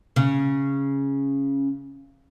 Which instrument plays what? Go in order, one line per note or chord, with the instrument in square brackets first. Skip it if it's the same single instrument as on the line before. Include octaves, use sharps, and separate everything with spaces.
[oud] C#3